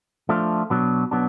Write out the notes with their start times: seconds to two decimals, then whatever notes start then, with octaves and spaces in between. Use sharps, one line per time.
0.29 F3 A3 D4 F4
0.70 B2 F#3 B3 D4
1.11 B2 F#3 B3 D4